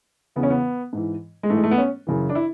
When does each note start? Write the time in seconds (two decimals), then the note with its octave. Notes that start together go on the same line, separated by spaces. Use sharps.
0.36 E2 C#3 E3 B3
0.43 C#4
0.50 B3
0.93 G#2 E3
1.43 G#3
1.50 G#2 E3 A3
1.57 G#3
1.64 A3
1.71 B3
1.78 C#4
2.07 F#2 C#3 E3
2.30 D4
2.35 E4